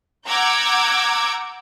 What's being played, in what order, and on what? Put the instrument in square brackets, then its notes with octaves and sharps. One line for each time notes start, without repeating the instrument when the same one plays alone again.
[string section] F#5 A#5 D6 E6 G6 G#6